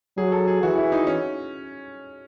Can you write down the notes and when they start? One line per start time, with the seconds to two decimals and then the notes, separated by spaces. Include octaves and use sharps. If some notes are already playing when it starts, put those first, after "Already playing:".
0.18 F#3 G#4
0.32 A4
0.48 G#4
0.62 E3 F#4
0.78 E4
0.92 D#4
1.07 C#4